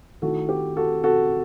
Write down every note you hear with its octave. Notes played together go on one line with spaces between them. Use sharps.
D#3 A3 E4 F#4 A4
G4
F#4 A4
F#4 A4